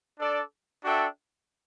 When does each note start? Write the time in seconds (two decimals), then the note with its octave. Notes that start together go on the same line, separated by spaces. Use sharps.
0.20 D4 A4 D5
0.85 D4 F#4 A4 E5 G5